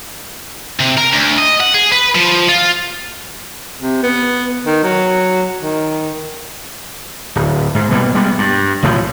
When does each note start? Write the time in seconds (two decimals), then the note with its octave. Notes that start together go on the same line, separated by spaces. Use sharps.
0.80 C3
0.98 A#4
1.13 D2
1.38 D#5
1.61 F#5
1.74 G#4
1.92 B4
2.15 F3
2.49 F4
3.81 C3
4.03 B3
4.66 D#3
4.84 F#3
5.59 D#3
7.36 D1
7.75 G#2
7.91 B2 G3 A#3
8.15 G3 G#3 B3
8.38 G2
8.83 B1 A2 C#3 F3